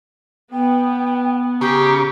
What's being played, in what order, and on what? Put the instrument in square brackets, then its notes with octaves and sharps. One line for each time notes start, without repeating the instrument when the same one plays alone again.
[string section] B3 [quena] G5
[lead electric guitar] C#3 [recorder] G4 [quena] A#5